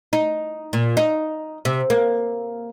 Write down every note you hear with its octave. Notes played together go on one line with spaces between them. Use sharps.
D#4
A#2
D#4
C3
A#3